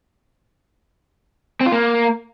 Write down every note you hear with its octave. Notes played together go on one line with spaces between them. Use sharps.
C4
F4
A#3